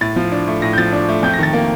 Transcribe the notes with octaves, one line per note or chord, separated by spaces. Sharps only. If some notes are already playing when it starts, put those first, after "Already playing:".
A2 A6
F3
D4
A3
A2 A#6
G6
F3 A6
D4
A3
F2 G6
A#6
D#3 A6
A#3